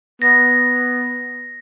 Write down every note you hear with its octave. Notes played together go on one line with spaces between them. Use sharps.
B3 A#6